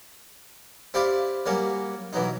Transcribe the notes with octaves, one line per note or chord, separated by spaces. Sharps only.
C4 E4 G4 D5 F5
F#3 G3 A#3 C#4
B1 E3 F#3 D#4